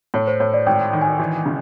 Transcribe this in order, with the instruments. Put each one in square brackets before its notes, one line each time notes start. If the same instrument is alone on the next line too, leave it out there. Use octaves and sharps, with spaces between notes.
[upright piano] A2 [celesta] C#5
[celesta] C5
[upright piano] A2 [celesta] C#5
[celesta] D5
[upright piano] G#1 [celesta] G5
[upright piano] D#3
[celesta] G#5
[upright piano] E3
C#3